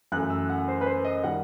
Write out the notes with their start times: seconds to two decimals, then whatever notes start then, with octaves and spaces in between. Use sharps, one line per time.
0.12 F#2 E3 A3 F#6
0.30 E6
0.50 F#5
0.68 C5
0.81 B4
0.86 C5
1.05 D#5
1.24 D#3 G3 F#5